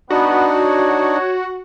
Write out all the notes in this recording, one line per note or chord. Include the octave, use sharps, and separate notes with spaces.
B3 D4 D#4 F#4
C#5